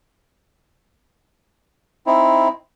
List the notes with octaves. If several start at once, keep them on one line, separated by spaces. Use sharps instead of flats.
C4 D#4 E4